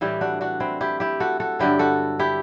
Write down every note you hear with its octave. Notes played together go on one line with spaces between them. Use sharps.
A2 E3 G3 E4 G4
D4 F#4
D4 F#4
C4 E4
E4 G4
E4 G4
F#4 A4
F#4 A4
G2 D3 F#3 E4 G4
F#4 A4
E4 G4